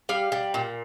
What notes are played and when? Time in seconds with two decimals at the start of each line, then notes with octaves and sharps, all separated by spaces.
0.09 G3 F5
0.32 G3
0.54 A#2